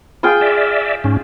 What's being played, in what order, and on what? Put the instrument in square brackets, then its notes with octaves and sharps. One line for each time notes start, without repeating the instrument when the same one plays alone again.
[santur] F4 G#4 G5
[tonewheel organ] D5 E5
G#2 C#4